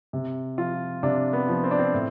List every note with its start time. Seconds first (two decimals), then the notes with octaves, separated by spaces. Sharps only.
0.13 C3
0.58 F3 F4
1.03 C3 D4
1.33 B3
1.48 F3
1.64 C4
1.71 D4
1.79 C4
1.94 A2